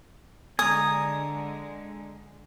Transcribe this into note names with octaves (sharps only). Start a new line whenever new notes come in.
D3 G#3 G#5 A#5 D#6